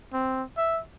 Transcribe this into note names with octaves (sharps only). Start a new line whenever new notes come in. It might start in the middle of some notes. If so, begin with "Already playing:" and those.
C4
E5